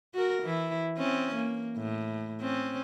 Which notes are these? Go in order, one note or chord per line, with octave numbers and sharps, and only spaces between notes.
F#4 A#4
E3 E4
E3 C4 C#4
A#3
A2
C4 C#4